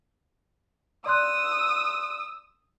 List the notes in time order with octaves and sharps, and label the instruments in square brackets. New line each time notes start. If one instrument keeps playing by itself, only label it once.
[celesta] D5 C6 F#6 [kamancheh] D#6 E6